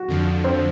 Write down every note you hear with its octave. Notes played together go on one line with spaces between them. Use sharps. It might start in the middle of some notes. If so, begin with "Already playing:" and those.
Already playing: F#4
F2 D3 F3
C4